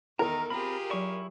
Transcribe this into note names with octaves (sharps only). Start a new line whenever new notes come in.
E2 D#3 A4 A#4 A#5
C4 F4 G4 G#4 B5
F#3 E4 D5 C#6